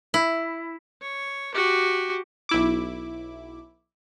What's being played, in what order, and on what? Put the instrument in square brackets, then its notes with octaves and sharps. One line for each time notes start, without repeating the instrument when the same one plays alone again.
[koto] E4
[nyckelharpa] C#5
F#4 G4
[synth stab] B1 E4 D6